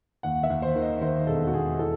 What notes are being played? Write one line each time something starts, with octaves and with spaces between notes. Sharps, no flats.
D#2 F#5
E5
D#2
C5
D#3
D#5
D#3 C5
E1 A4
F#4
E1 G#4
E3 A4